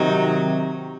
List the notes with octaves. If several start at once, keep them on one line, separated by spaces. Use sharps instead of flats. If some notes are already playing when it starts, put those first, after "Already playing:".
Already playing: C3 D#3 F#3 D#4